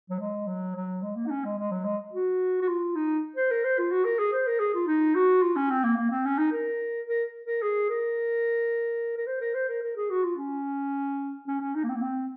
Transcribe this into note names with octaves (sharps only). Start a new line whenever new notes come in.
F#3
G#3
F#3
F#3
G#3
A#3
D#4
C#4
G#3
G#3
F#3
G#3
F#4
F#4
F4
D#4
C5
A#4
C5
F4
F#4
A#4
G#4
C5
A#4
G#4
F4
D#4
F#4
F4
C#4
C4
A#3
A#3
C4
C#4
D#4
A#4
A#4
A#4
G#4
A#4
A#4
C5
A#4
C5
A#4
A#4
G#4
F#4
F4
C#4
C#4
C#4
D#4
A#3
C4
A#3
C4